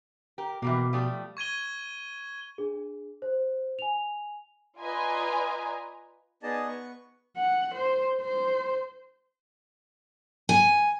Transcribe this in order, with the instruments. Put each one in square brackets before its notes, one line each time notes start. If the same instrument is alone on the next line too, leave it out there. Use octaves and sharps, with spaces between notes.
[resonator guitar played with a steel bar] G4 A#4
[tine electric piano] B2 [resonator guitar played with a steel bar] E3 G3 A#3
[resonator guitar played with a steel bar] F3 G3 A3
[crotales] C#6 G#6 D#7 G7
[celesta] D4 G#4
C5
G#5 F7
[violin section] F4 B4 D5 D#5 G#5 A#5
[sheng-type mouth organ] B3 D#4 G#4 D5 D#5 A5
B3 C#6
[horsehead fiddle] F#5
C5
C5
[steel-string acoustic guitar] G#5